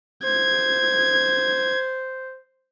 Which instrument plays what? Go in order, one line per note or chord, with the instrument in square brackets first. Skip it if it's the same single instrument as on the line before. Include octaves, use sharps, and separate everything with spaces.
[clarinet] C5 [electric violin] G#6